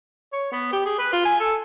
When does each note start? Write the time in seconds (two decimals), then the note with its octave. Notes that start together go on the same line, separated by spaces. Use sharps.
0.33 C#5
0.52 B3
0.73 G4
0.86 G#4
0.99 B4
1.13 F4
1.25 G#5
1.40 A4